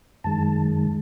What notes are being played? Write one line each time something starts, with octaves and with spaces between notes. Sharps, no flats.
F#2 D#3 G#3 A5